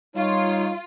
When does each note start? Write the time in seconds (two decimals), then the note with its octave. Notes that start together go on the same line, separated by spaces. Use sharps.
0.16 G3 D#4 F4 C#5